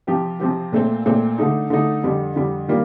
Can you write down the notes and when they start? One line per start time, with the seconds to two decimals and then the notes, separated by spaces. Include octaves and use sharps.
0.07 C3 F3 C4 G4
0.40 C3 F3 C4 G4
0.73 A#2 A3 C4
1.06 A#2 A3 C4
1.38 D3 A3 D#4
1.70 D3 A3 D#4
2.04 F2 D3 G3
2.36 F2 D3 G3
2.68 D#3 G3 A#3 F4